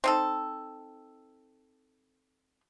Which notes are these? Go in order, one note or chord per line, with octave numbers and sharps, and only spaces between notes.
C4 D#4 A4